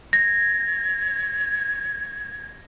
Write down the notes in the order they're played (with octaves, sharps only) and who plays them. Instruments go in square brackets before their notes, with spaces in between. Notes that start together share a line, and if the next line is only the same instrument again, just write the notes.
[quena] G#6 [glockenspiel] A#6